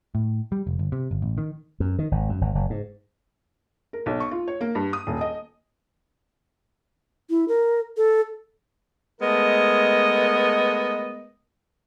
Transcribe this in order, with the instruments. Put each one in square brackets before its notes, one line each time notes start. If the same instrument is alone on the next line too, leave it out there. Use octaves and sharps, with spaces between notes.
[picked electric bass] A2
G3
F1
G1
C3
G1
A1
D#3
[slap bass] F#2
D#3
G#1
F#2
G#1
F#1
G#2
[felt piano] A#4
B1
C#6
F4
C#5
A#3
G2
D#6
D#1
D#5
[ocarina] E4
A#4
A4
[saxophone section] G#3 A3 B3 A#4 D#5